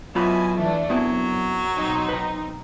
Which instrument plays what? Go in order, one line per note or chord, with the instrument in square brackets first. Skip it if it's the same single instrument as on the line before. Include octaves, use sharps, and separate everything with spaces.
[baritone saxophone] B2 [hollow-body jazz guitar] F#3 F4 B5 [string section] E4 G#5
[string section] E3 A3 D4
[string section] F#2 [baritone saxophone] F#3 [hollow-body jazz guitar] B3 C4 E4
[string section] B1 C4 D#4
[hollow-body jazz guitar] B4 A#5